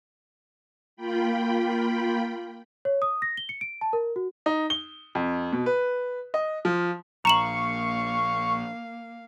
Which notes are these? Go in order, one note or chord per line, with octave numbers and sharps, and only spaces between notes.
A#3 F4 G5 B5
C#5
D#6
A#6
G7
C#7
D7
A5
A#4
F#4
D#4
G7
F2
B2
B4
D#5
F3
A#1 A#3 F5 A#5 C#6 E7 F#7